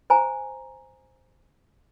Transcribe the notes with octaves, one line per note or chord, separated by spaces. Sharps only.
C5 G#5 A#5